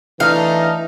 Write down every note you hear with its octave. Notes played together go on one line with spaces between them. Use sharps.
E3 A3 D4 D#4 F5